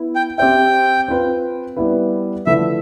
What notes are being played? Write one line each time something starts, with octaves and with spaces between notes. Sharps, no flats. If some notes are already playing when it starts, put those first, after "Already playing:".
Already playing: B3 E4
G5
C4 G4 C5 E5 G5
C4 F4 B4
G3 B3 E4 B4
D3 F3 A3 E4 B4 E5